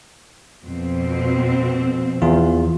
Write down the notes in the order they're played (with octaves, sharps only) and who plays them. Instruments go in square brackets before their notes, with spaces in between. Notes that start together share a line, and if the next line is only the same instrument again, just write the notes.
[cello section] F2 B2 C4
[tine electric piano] E2 F4